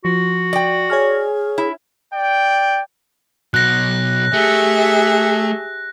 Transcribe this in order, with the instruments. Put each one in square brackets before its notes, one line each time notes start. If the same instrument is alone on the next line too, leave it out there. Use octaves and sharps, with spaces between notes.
[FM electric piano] F3 [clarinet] F#4
[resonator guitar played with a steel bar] D5 G5
[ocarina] G#4 [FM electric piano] C#5 G#5 F6
[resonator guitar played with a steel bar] E4
[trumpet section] D5 G5
[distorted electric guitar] B2 F#3 [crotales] F#6 A#6
[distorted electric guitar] A3 [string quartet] G4 G#4 E5